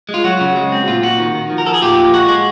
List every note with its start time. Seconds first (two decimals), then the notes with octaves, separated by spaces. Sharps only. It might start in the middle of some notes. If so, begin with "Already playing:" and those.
0.09 G#3
0.14 F4
0.24 F#3 F#4
0.41 C#3
0.56 G#3
0.72 C4
0.87 A#2 F4
1.03 A#2 F#4
1.19 D#3
1.34 D#3
1.50 F3
1.58 A#4
1.66 F3 A4
1.74 G#4
1.82 A#2 F4 G4
1.97 A#2
2.13 G#3 F#4
2.28 G#3